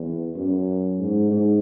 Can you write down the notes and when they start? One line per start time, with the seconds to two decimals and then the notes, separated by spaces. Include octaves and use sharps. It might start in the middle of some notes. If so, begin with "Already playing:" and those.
Already playing: E2
0.35 F#2
0.99 G#2
1.31 G#2